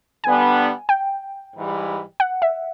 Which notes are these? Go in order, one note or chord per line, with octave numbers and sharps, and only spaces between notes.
D3 G3 B3 D4 G#5
G5
G#2 E3 G3
F#5
E5